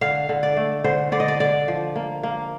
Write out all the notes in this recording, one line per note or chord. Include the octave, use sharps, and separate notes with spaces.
D3 F5
D3
D5
A3
D3 C5
D3 D5
D#5
D5
D3 D5
F3
A#3
A#3